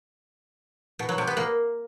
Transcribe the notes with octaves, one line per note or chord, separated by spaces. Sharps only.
B2
F#3
C3
B3
A#3